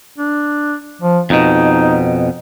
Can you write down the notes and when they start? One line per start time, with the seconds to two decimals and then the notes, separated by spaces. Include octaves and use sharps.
0.19 D4
1.02 F3
1.30 F2 B2 D#4